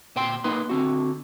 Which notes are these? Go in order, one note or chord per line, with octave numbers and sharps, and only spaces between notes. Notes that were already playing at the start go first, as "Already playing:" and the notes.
A#2 C5 G5 C6
A#3 D#4 B4 C6
D3 C4 F#4